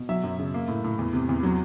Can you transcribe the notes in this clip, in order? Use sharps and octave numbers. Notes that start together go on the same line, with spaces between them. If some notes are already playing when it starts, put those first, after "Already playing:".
Already playing: B2
F#3 E5
F#2
C#3
A#3
A2
A2
E2
C3
E2
F#3